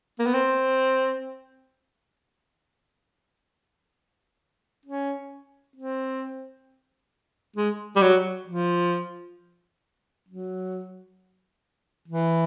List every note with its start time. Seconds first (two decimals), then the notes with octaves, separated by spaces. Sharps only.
0.19 A#3
0.26 B3
0.34 C4
4.86 C#4
5.76 C4
7.56 G#3
7.96 G3
8.02 F#3
8.47 F3
10.28 F#3
12.08 E3